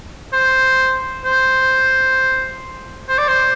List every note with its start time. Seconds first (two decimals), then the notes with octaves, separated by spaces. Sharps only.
0.33 C5
1.25 C5
3.09 C5
3.18 D5
3.28 C5